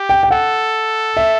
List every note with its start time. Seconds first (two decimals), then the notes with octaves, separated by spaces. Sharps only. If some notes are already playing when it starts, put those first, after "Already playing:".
Already playing: G4
0.09 G5
0.23 G5
0.31 A4 F#5
1.17 E5